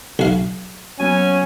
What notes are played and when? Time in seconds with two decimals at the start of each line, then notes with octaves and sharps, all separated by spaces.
0.19 B1 F5
0.99 F#3 B3 C#4 G#5